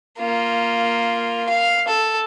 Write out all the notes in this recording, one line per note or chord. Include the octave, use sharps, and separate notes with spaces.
A#3 F4
F5
A4